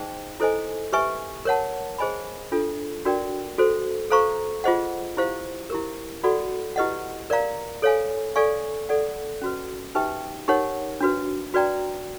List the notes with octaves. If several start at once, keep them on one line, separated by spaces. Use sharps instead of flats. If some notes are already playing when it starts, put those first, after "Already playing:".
Already playing: D#4 G#4 C5 D#5 G5
E4 A4 C5 D#5 G#5
G4 B4 E5 G#5 C#6
A#4 C#5 F#5 A5
G#4 C5 D#5 G#5 B5
D4 F4 A4
D4 F#4 A#4 D5 G5
F#4 A4 C5
A4 C5 F5 A#5 C#6
F4 G#4 C5 D#5 F#5
E4 G4 C5 F5
E4 G4 A#4
F#4 A4 D5 F#5 B5
E4 G4 B4 D#5 F#5
A#4 D5 F5 A#5
A4 C#5 F5 G#5
A4 D5 F5 G#5 C#6
A4 D5 F#5
C#4 F#4 B4
D#4 G4 B4 E5 G5
D#4 G4 A#4 C#5 F#5
D4 F#4 B4
F#4 B4 D5 G5 A#5